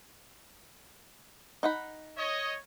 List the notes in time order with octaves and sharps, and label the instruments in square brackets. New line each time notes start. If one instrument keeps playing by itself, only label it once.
[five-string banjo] D#4 F#5 B5
[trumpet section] C#5 D#5